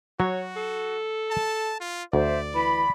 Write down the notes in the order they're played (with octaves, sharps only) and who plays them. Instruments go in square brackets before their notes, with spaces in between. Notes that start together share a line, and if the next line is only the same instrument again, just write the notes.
[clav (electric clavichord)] F#3 [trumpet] F#4 [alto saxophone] C#5
[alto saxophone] A4
[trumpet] A5
F4
[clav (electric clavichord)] D2 [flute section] C5 E5 [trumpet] D5
[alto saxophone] E3 [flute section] B5